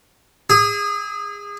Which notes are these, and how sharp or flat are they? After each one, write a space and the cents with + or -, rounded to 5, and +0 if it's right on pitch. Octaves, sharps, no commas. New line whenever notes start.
G#4 -30 D#6 +45